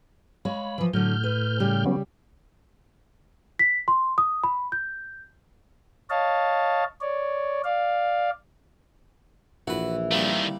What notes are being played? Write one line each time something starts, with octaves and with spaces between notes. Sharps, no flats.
G#3 C#5 F5 B5
E3 F3
A2 D3 F#3 F6 G6
B4
C#3 G3 G4
F#3 B3 C#4
B6
C6
D#6
B5
G6
C#5 D#5 F5 A5
C#5 D5
D5 F5
A#1 E3 F#4 B4
A#2 D#3 G3 A3 C4